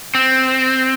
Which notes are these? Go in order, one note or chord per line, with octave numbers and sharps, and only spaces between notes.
C4